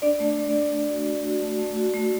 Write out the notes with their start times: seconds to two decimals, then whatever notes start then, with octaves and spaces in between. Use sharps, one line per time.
0.02 D4 D5
0.20 A3
0.37 A3
0.49 D5
0.54 A3
0.72 A3
0.90 F#4
1.07 A3
1.24 F#4
1.42 A3
1.59 A3
1.77 F#4
1.94 A3